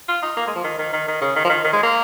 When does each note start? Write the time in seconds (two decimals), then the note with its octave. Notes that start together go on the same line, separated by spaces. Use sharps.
0.08 F4
0.22 D#4
0.37 A#3
0.47 G#3
0.56 F3
0.64 D#3
0.79 D#3
0.93 D#3
1.08 D#3
1.21 C#3
1.36 D#3
1.44 F3
1.49 D#3
1.64 D#3
1.73 G#3
1.83 A#3